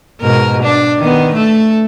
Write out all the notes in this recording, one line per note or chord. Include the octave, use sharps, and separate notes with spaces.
G#2 B2 A#4
D4
D#3 B3
A3 A4